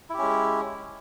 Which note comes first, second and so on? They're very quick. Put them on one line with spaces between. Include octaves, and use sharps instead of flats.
E4 G4 C#4 G#3